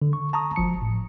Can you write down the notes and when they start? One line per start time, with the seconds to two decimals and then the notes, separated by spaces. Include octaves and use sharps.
0.02 D3
0.13 C#6
0.33 A5 A#5 C#6 D#6
0.56 G1 F3 C#7
0.82 A2